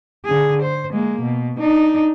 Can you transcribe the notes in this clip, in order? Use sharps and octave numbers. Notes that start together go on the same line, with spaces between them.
D3 G#4
C5
G#3 A#3
B2
D4 D#4